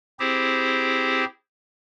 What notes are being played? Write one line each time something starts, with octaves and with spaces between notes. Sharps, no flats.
C4 E4 G4 G#4 C5